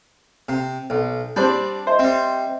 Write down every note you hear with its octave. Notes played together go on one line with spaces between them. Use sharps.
C3
B1
G3 C4 D4
C5 D#5 E5
G3 C4